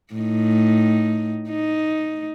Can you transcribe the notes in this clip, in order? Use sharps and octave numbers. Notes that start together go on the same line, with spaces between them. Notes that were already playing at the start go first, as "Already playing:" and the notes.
A2 D#4
D#4